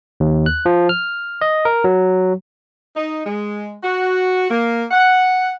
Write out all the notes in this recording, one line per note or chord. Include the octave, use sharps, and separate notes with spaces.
D#2
F#6
F3
F6
D#5
A#4
F#3
D#4
G#3
F#4
A#3
F#5